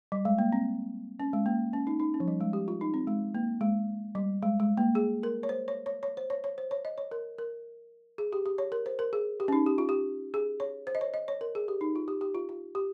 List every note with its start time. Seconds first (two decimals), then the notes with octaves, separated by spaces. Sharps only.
0.12 G3
0.25 G#3
0.38 A#3
0.53 C4
1.20 C#4
1.33 G#3
1.46 A#3
1.73 C#4
1.87 D#4
2.00 D#4
2.14 C#4
2.20 F3
2.28 G3
2.41 G#3
2.53 G4
2.68 F4
2.81 D#4
2.94 C4
3.07 G#3
3.35 A#3
3.61 G#3
4.15 G3
4.43 G#3
4.60 G#3
4.77 A#3
4.95 G#4
5.23 A#4
5.43 C#5
5.49 C5
5.68 C#5
5.86 C#5
6.03 C#5
6.17 C5
6.30 C#5
6.44 C#5
6.58 C5
6.71 C#5
6.85 D#5
6.98 C#5
7.11 A#4
7.38 A#4
8.18 G#4
8.33 G4
8.46 G4
8.58 C#5
8.72 A#4
8.86 C5
8.99 A#4
9.13 G#4
9.40 G4
9.48 C#4
9.52 D#4
9.66 G4
9.78 F4
9.89 G4
10.34 G#4
10.60 C#5
10.87 C5
10.95 D#5
11.01 C#5
11.14 D#5
11.28 C#5
11.41 A#4
11.55 G#4
11.68 G4
11.81 D#4
11.96 F4
12.08 G4
12.21 G4
12.35 F4
12.49 F4
12.75 G4